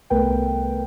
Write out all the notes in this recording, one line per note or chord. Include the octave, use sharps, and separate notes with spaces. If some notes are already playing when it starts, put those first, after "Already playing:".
C2 A3 B3 A#4 B4 G5